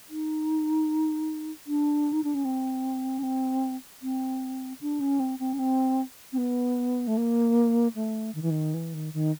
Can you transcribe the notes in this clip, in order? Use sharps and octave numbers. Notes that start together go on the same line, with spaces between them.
D#4
D4
D#4
D4
C#4
C4
C#4
C4
C4
D4
C#4
C4
C4
C#4
C4
C4
B3
A3
A#3
A3
D#3
E3
D#3
E3
D#3
D#3